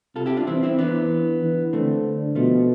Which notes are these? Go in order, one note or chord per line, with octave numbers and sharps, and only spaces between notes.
C3 F4 A4
E4 G4
D4 F4
E3 C4 E4
C4 E4
E3 B3 D4
E3
D3 A3 C4
B2 F3 A3